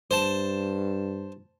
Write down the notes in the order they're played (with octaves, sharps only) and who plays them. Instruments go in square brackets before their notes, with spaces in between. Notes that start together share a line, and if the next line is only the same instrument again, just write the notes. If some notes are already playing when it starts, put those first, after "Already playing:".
[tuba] G2 [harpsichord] C5 A5